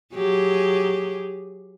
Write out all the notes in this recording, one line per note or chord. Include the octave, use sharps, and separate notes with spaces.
F#3 G4 G#4